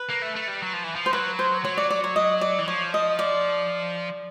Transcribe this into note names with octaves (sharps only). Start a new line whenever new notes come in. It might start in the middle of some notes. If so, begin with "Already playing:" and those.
Already playing: B4
A#3
A3
A3
G3
F#3
F3
E3
F3
C5
F#3 B4
C5
F#3 C#5
D5
D5
C#5
D#5
D5
E3
F3 C#5
D#5
D5